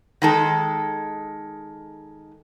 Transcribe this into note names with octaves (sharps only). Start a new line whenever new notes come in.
D#3 G#3 A4